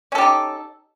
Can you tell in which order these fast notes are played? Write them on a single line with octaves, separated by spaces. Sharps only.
C#4 A4 G4 D#4